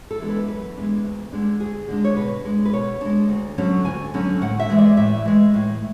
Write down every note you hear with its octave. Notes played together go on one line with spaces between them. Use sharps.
A4
E3 G#3 B3 D4
B4
F#2 B4
E3 G#3 B3 D4
D2
D3 G#3 D4
D2 G#4
D3 G#3 D4
C#5
B2 B4
G#3 D4
B4
B2 C#5
G#3 D4
D2
D3 F#3 C#4
D2 G#5
D3 F#3 C#4
A2 F#5
E5
E3 G#3
D5
A2 E5
E3 G#3
A2